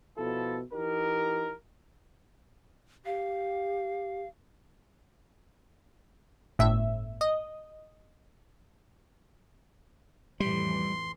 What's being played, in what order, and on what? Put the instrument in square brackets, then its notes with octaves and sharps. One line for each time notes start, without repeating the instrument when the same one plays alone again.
[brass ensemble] B2 F3 E4 A4
E3 D#4 G4 A#4
[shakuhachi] G4 [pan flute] F5
[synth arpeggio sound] G1 A2 E5
D#5
[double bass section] F2 A2 E3 [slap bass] G3 [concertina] C6